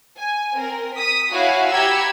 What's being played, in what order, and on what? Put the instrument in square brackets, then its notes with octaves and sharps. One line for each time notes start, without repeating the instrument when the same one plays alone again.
[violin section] G#5
C4 A#4
D#6 B6
E4 F#4 C#5 F5 G#5
G4 A#5 B5 E6 G#6 C#7